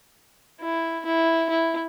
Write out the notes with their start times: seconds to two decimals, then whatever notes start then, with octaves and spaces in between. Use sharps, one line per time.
0.61 E4
1.06 E4
1.50 E4